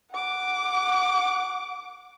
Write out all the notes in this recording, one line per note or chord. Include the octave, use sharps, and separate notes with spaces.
F#5 D6